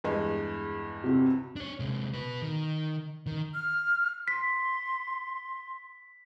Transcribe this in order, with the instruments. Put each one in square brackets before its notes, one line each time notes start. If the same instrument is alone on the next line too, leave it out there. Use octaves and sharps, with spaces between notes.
[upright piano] E2 G2 G#3
[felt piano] C3 C4 F#4
[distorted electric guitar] D4 C#5
C3 G#3
F#4 B4
D#3
D#3
[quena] F6
[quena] C6 [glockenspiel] B6